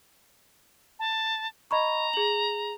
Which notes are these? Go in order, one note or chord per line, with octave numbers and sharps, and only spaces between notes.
A5
D#5 A#5 B5 C#6
G#4 F#7